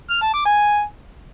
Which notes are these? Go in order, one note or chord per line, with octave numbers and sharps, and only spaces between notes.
F6
A5
D6
G#5